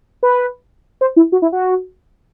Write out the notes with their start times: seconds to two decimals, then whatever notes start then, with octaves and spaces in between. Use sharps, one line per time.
0.23 B4
1.01 C5
1.16 E4
1.32 F#4
1.42 E4
1.52 F#4